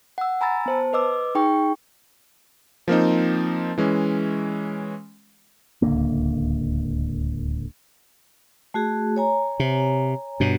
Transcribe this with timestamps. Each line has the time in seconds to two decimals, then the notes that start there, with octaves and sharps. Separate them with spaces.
0.18 F#5 E6
0.41 G#5 A#5 B5 E6 A6
0.66 B3 C5 A5
0.93 B4 D#5 D6 E6
1.35 D#4 G#4 G5 C#6
2.88 F3 A#3 C4 D#4
3.78 E3 G#3 C#4
5.82 D1 C#2 D3 A#3
8.74 A3 F#4 G#4
9.16 C#5 G#5 A#5
9.60 C3
10.40 G2 B2